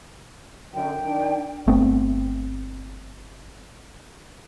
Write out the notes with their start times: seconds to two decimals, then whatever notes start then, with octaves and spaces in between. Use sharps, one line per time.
0.74 F#2 D3 G5
1.05 D#3 D4
1.67 G1 A3 B3 C4